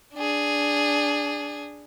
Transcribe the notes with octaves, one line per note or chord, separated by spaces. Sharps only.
D4 G#4